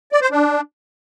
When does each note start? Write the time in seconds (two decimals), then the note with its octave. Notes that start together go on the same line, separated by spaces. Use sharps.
0.12 D5
0.22 C5
0.31 D4